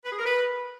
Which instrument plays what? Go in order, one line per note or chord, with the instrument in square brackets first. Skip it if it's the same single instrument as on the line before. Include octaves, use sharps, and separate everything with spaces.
[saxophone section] B4
G#4
A#4
B4